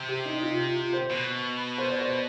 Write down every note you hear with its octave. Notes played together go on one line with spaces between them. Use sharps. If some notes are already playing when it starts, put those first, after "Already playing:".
Already playing: C3
G4
D#4
D#4
F4
F4
F4
C5
B2
C5
D5
C5